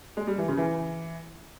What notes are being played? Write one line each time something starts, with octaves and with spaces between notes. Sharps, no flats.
G#3
G3
E3
C#3
E3